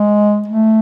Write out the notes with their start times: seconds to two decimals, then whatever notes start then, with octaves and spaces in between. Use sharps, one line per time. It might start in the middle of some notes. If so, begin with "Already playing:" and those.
Already playing: G#3
0.48 A3